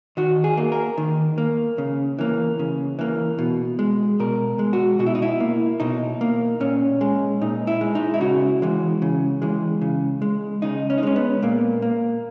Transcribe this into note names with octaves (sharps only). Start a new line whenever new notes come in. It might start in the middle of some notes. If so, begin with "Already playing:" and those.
D#3 F#4
G#4
A#3
A#4
D#3
A#3
C#3
E3 A#3
C#3
E3 A#3
B2
G#3
B2 A#4
G#3
F#4
B2 F#4
E4
D#4
E4
A#3
B2 D#4
A#3
A#2 C#4
G#3
A#2 D#4
E4
G#3
D#4
E4
C#3 F#4
E3 G#3
C#3
E3 G#3
C#3
G#3
C#3 D#4
C#4
D#4
G#3 C#4
B3
A#2 A#3
A#3